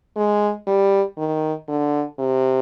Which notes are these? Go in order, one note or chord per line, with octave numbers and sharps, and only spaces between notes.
G#3
G3
D#3
D3
C3